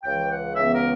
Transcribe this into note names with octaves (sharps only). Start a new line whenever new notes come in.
C#2 C#3 E3 G5
F#5
C#2 C#3 E3 B3 E5
A#4